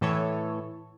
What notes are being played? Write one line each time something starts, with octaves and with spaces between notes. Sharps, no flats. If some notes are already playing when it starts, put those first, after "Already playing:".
A2 E3 A4 C#5